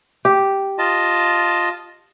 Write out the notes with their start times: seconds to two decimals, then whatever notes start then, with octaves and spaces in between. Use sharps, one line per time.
0.25 G4
0.78 F4 D#5 A5